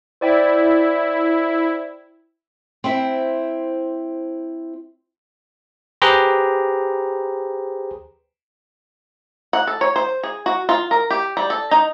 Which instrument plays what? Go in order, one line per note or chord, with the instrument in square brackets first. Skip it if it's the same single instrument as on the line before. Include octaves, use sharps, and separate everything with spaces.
[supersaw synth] E4 [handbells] C5 D5 G5
[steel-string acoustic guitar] C4 E4 C5 E5
[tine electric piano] G4 G#4 B4 C5 A#5
[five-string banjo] F#5
A4
C#5
C5
G#4
F#4
F4
A#4
G4
G3
A4
D#4